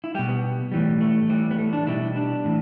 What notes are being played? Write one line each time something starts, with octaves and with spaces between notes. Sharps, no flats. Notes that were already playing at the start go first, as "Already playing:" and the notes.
E4
B2 G3 G4
B3
A2 E3 G3
A3
A2 E3 G3
B3
A3
D4
B2 G3 E4
D4
A2 E3